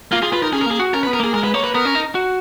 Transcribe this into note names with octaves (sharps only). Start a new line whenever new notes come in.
A#3 F4
F4 G#4
F4 B4
D#4 A#4
C#4 G#4
A#4
A#3 G#4
F#4
C#4 A#4
B4
B3
A#4
A#3 G#4
G#3 A#4
B4
A#3 C#5
B4
B3 A#4
C#4
D#4
F#4